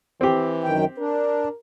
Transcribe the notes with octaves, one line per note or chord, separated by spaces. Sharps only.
E3 C4 G4
F#2 D#3 G5
D4 A#4